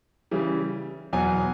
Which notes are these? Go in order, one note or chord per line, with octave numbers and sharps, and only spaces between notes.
C#3 E3 G3
E2 B2 F#3 G#5